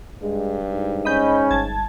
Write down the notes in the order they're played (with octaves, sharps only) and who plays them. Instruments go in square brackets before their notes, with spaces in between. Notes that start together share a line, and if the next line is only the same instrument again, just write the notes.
[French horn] G2 [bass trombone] G#3
[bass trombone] G#2
[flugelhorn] C#4 [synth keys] D#5 B5 G6
[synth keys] G1 A5 G#6